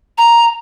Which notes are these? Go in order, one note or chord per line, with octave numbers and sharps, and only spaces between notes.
A#5